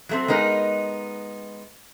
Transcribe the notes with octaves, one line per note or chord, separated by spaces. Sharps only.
F#3 A3 C4
G#3 B3 D#4 A#4